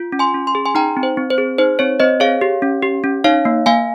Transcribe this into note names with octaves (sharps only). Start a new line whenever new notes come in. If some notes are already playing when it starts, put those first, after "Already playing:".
Already playing: F4
C#4
G#5 C6
C#4
C6
G#4
G#5 C6
D#4 G5 A#5
C4
C5
C4
C5
G#4
D#4 C5
C4 C#5
C4 C5 D#5
G#4 C#5 F5
G4
C#4
G4
C#4
D#4 C#5 F5
A#3
A#3 F5 G#5